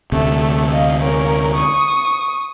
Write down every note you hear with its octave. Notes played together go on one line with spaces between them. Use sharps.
D2 C3 A3
D#5 F5
C#4 A#4
C#6 D#6